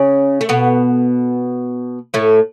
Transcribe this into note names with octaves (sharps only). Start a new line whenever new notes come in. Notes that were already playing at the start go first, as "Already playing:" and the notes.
Already playing: C#3 C#4
A3
B2 B3
A2 A3